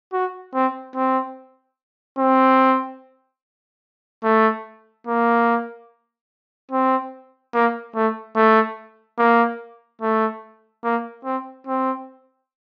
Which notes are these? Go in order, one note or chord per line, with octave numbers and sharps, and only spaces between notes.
F#4
C4
C4
C4
A3
A#3
C4
A#3
A3
A3
A#3
A3
A#3
C4
C4